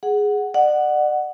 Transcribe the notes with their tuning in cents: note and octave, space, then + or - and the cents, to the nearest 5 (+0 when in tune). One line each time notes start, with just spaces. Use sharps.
G#4 +0 F#5 +0
D5 +35 F#5 +0